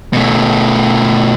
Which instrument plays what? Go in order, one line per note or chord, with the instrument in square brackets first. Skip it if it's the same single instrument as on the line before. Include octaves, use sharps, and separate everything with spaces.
[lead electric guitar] B2 A3